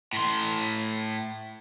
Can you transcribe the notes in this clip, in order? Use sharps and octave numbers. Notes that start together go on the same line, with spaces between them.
A2 C6